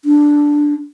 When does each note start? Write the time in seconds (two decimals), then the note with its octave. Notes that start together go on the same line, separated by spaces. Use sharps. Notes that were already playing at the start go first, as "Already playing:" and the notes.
0.05 D4